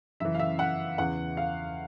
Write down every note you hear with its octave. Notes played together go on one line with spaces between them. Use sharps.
F#2 C#3 E3 E5
F5
E5
F#5
E2 C#3 E3 F#5
F5